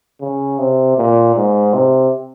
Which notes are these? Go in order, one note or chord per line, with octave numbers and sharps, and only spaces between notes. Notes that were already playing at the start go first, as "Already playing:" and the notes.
C#3
C3
A#2
G#2
C3